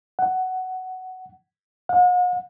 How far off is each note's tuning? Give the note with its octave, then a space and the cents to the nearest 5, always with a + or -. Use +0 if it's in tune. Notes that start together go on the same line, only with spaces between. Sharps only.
F#5 +10
F#5 -45